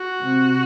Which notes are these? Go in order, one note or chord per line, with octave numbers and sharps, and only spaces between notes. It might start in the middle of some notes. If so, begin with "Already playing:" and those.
Already playing: F#4
C3